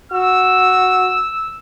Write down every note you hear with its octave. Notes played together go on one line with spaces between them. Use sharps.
F#4 E6